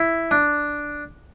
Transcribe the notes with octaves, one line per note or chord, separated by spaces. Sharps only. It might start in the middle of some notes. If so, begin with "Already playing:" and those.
Already playing: E4
D4